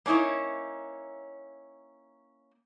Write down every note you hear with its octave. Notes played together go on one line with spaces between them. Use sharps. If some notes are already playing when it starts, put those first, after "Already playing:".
A#3 C#4 D#4 E4 C#5